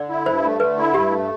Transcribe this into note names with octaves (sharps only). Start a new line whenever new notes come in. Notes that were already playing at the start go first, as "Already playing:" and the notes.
Already playing: D3 D5
E4
G2 C5
A3
D3 B4
E4
G2 G4
A3